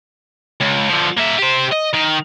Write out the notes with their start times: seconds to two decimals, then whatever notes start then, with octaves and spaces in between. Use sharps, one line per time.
0.60 C#2
0.89 D3 F3
1.17 A#3 E5
1.38 G4 C5
1.72 D#5
1.93 D#3